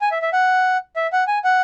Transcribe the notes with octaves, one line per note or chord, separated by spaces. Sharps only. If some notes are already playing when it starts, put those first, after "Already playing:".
G#5
E5
E5
F#5
E5
F#5
G#5
F#5